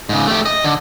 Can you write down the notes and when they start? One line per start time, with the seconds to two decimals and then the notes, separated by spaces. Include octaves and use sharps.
0.09 G#2 C#3
0.27 A3 G4
0.46 D#5
0.64 D3